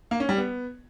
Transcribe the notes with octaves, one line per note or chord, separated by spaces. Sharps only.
A#3
C#4
G3
B3